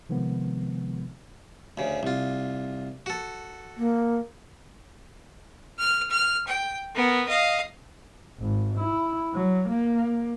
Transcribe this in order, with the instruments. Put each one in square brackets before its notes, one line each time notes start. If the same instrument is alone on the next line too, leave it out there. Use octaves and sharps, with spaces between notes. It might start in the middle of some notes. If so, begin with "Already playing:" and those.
[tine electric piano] C3 D#3 F3 G#3 B3
[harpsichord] D2 C#3
C2 F4
F#4 A4
[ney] A#3
[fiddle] F6
F6
G5
B3 A#4
D#5 F5
[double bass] G#1
E4
F#3
A#3